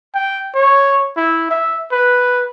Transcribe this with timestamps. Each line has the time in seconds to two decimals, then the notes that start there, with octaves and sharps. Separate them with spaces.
0.15 G5
0.55 C#5
1.16 E4
1.51 E5
1.92 B4